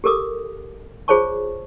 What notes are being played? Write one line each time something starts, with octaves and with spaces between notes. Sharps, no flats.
G4 A4 A#4 D6 D#6
F4 G#4 C5 C#5 A5 C#6